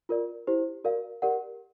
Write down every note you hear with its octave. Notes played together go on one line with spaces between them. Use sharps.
F4 A#4 D5
E4 G4 C5
F#4 A#4 D5 F5
G4 A#4 D5 F#5